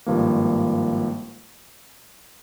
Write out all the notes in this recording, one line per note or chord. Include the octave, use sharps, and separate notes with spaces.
G#1 G2 F3 A#3